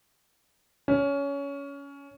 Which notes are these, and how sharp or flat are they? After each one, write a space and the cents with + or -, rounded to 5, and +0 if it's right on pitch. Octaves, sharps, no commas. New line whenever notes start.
C#4 +20